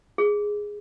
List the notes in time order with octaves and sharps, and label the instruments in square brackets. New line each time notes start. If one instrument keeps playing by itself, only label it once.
[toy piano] G#4